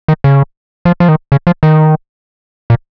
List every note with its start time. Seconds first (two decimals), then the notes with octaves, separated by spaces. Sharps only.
0.08 D#3
0.24 C#3
0.85 F3
1.00 F3
1.09 D#3
1.32 C#3
1.47 F3
1.63 D#3
2.70 A#2